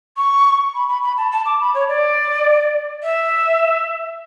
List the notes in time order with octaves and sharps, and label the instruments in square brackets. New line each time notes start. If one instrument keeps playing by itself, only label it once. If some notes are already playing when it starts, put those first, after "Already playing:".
[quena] C#6
B5
B5
B5
A5
A5
D6
B5
C#5
D5
E5